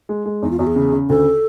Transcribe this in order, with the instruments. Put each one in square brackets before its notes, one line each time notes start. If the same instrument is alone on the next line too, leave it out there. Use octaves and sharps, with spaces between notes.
[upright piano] G#3
G#3
[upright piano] E2 [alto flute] D#4
[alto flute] F4
[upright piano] E2 [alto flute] F#4
[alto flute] G#4
[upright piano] C#3
C#3
[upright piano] D2 [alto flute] A4